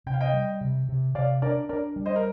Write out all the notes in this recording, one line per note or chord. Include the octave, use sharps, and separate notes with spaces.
C3 G5
F5
D#5 G5
G3
C3
C3
C3 D5 F5
D4 A#4 D5
D4 A#4 D5
G3
C5 D#5
A#4